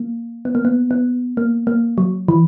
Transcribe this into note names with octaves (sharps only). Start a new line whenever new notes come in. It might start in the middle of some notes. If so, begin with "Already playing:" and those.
Already playing: A#3
B3
A#3
B3
B3
A#3
A#3
F#3
E3